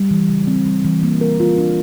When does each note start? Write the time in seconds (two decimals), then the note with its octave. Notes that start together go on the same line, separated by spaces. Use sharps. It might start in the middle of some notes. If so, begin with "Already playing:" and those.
Already playing: G3
0.11 E3
0.29 C#3
0.47 C4
0.66 G3
0.85 E3
1.03 A#3
1.21 A#4
1.40 F4
1.58 D4